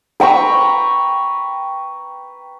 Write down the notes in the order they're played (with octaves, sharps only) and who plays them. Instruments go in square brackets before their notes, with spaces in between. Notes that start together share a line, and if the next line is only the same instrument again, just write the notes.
[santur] B4 G5 A#5 C#6